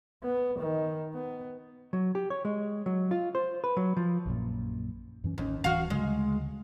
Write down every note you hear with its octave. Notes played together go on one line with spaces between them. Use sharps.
B3
D#3
B3
F#3
G4
C#5
G#3
F#3
F4
C5
B4
F#3
F3
A#1 F#2 A#2
F#2 E3 C#4
A1 D#2 C#4
D1 E3 F#4 F5
D2 C#3 G#3